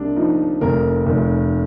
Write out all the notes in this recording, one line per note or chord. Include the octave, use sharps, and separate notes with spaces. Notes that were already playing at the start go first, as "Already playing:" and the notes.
Already playing: C2 D4
F3 D#4
F1 A#4
F1